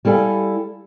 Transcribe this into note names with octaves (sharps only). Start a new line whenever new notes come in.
G3 E4 A4 F5 G#5